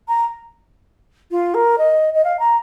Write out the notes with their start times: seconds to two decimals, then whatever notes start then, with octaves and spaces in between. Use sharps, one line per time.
0.08 A#5
1.31 F4
1.54 A#4
1.78 D#5
2.14 D#5
2.24 F5
2.39 A#5